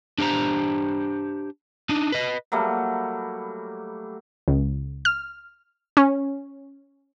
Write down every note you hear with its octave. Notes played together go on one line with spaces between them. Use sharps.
D4 G4 C5 A#5
D4 D#4
B4 D#5
F#3 G3 A3 A#3
C#2
F6
C#4